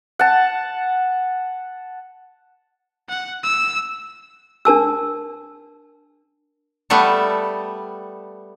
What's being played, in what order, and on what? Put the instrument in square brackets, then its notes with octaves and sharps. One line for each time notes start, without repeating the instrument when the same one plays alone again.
[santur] F#5 A5
[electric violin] F#5
E6
[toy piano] D4 A#4 A5 E6
[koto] G3 A3 B3 A4